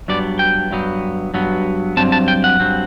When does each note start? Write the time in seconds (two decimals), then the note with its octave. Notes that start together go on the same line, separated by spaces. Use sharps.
0.08 G2 F#3 B3 D5
0.39 G5
0.71 G2 F#3 B3
1.34 G2 F#3 B3
1.97 G2 F#3 C4 A5
2.12 A5
2.28 G5
2.44 F#5
2.60 G2 F#3 C4